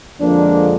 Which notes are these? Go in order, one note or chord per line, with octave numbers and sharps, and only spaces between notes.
F2 D3 F3 G#3 A#3 D4